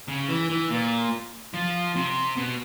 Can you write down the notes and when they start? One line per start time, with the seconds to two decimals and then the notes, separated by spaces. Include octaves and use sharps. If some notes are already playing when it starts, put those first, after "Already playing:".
0.08 C#3
0.28 E3
0.49 E3
0.70 A#2
1.54 F3
1.95 C3
2.37 B2